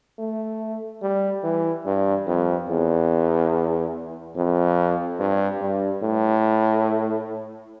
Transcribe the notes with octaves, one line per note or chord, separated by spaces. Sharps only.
A3
G3
E3
G2
F2
E2
F2
G2
G2
A2